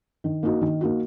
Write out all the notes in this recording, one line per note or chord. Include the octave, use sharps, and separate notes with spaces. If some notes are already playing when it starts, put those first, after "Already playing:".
D#3
A#3 D#4 F#4
D#3
A#3 D#4 F#4